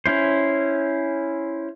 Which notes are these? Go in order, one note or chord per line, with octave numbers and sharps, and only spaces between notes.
C#4 E4 C5